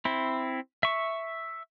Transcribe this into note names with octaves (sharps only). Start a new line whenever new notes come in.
C4 E4
E5 C#6